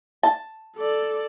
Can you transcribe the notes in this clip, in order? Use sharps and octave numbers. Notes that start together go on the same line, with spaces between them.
A5
A4 D5